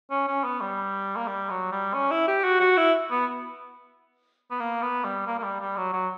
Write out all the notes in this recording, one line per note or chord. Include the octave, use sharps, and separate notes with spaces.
C#4
C#4
B3
G3
A#3
G3
F#3
G3
C#4
E4
G4
F#4
F#4
E4
B3
B3
A#3
B3
G3
A#3
A#3
G3
G3
F#3
F#3